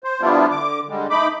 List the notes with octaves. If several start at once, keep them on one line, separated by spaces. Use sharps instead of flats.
C5
F3 G3 B3 D4 E4 F4
D3 D6
D3 G3 G#3
A3 D#4 B5 D6